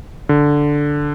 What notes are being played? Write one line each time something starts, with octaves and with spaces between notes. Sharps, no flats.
D3